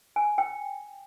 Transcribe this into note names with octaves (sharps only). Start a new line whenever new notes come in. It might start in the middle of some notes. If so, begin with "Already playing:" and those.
G#5
G5